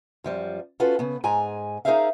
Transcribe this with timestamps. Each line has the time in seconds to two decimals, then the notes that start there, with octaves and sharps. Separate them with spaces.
0.24 F#2 F3 G3
0.80 C#4 F4 F#4 A4 B4 C5
0.99 C#3 B3
1.24 G#2 G#4 G#5 A#5
1.85 D#4 G#4 A#4 C5 E5 F5